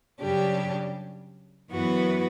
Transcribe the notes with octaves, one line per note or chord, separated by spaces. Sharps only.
F#2 C#3 G3 D4 G4
F#2 E3 B3 F#4 B4